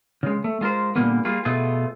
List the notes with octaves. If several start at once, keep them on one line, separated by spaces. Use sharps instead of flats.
C#3 G#3
A3
G#3 F4 A#4 C5
A#2 D3 F3 G3 A#3 B3
G3 A#3 F4 G#4
B2 A3 B3 F4 G#4